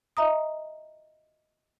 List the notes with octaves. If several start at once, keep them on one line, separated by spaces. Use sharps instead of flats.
D#5 E5 A#5 D#6